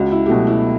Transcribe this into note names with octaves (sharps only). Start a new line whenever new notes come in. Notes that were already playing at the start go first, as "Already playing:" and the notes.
Already playing: C#2 F#4
E4
G4
B2 F#3 A3 F#4
E4